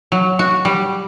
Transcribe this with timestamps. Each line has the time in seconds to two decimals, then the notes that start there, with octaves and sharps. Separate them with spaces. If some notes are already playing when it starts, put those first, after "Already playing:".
0.12 F#3
0.39 F#4
0.65 G3